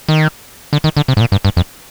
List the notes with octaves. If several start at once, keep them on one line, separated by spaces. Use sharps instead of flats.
D#3
D3
D#3
D3
C3
G#2
A#2
G2
G2
F2